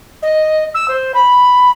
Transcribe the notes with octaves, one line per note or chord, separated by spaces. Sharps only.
D#5
E6
C5
B5